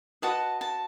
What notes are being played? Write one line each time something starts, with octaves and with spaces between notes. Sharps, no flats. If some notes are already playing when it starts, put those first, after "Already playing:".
F#4 B4 D#5 A5
A5